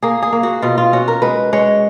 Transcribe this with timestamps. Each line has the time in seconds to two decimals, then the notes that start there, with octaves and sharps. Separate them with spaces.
0.02 A#3 G#4
0.22 G#4
0.32 A#3
0.43 F#4
0.62 B2 F4
0.78 F4
0.93 C#4 F#4
1.08 A#4
1.22 G#3 B4
1.53 G#3 C#5